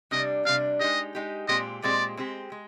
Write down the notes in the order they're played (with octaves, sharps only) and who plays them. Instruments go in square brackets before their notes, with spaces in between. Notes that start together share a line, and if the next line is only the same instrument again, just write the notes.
[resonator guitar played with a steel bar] C3 G3 D4 [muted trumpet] D#5
[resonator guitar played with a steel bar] C3 G3 D4 [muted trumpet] F5
[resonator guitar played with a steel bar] G#3 D#4 G4 [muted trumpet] D#5
[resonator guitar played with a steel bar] G#3 D#4 G4
[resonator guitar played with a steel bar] A#2 G#3 C4 G4 [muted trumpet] D#5
[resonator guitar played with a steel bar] A#2 G#3 C4 G4 [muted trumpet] D5
[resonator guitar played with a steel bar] G#3 C4 G4
G#3